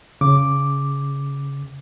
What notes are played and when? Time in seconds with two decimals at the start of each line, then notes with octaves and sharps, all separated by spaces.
0.21 C#3 D6